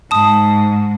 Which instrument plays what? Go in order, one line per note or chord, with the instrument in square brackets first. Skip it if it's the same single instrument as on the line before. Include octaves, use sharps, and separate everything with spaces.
[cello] G#2 [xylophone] A5 D#6